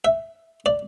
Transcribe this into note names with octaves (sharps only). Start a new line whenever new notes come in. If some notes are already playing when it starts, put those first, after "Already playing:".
E5
D5